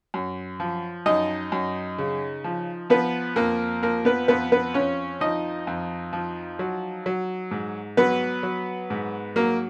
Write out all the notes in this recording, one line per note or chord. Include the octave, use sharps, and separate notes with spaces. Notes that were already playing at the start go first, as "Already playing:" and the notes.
F#2
F3
F#2 D#4 D#5
F#2
C#3
F3
F3 B3 B4
F2 A#3 A#4
F3 A#3 A#4
B3 B4
F2 B3 B4
B3 B4
F2 C#4 C#5
F3 D#4 D#5
F2
F3
F#3
F#3
G#2
F#3 B3 B4
F#3
G#2
F#3 A#3 A#4